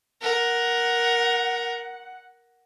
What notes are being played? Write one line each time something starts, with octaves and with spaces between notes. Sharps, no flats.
A#4 F#5